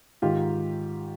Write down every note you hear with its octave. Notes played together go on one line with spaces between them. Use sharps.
G#2 D#3 F4 G4